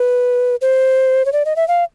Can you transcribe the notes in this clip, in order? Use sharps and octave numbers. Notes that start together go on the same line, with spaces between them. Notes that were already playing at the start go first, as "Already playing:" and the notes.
Already playing: B4
C5
C#5
D5
D#5
E5
F5